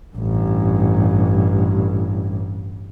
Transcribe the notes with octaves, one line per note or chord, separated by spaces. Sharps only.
A1 G2